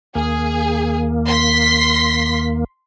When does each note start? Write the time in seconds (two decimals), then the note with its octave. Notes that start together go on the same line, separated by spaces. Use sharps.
0.15 D#2 A#3 G#4
1.26 C6 B6